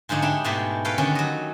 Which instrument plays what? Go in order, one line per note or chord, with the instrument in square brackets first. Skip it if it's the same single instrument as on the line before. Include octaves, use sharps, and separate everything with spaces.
[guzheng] G#2 D3 F3 D#4 C#5
D4 E4 G4
G#2 B2 G#3 A3 G4
A4 B4 C#5 F5 G5
D3 D#3 C#4
F#3 D#5